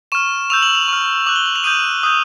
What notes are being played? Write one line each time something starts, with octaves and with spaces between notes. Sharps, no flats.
C#6 F6 E7
C#6 E6 G6 F7
F#7
F7
C#6 F6
D6 F#6 F#7
G7
F#7
F7
D#6 G6 D#7
D#6 G6